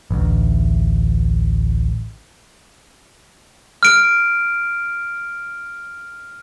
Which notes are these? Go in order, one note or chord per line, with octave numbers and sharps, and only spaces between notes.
A1 D2
F6 D7